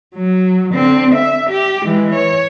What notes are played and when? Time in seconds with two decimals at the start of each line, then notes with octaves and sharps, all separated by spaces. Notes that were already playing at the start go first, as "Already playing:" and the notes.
0.15 F#3
0.73 D3 C4
1.15 E5
1.50 G4
1.85 E3 G#3
2.15 C#5